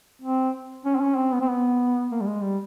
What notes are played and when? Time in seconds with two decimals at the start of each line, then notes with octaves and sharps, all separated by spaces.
0.22 C4
0.85 C#4
0.96 C4
1.01 C#4
1.17 C4
1.33 B3
1.41 C4
1.49 B3
2.12 A#3
2.21 G3
2.27 G#3
2.43 G3